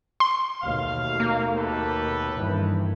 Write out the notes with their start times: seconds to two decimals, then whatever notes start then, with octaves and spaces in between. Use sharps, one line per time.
0.20 C6
0.62 D#2 B2 A3 F5
1.20 A#3
1.56 G4 A4 B4
2.35 G2 D#3 E3